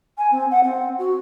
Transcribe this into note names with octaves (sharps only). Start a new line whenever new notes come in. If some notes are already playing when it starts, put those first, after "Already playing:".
G#5
C4
F#5
C4
F#4